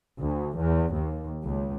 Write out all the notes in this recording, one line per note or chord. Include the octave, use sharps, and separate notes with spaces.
D2
E2
D#2
C#2